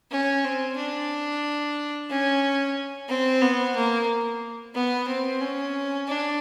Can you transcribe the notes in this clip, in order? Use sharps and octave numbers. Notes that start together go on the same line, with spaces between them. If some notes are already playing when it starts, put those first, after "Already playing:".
C#4
C4
D4
C#4
C4
B3
A#3
B3
C4
C#4
D4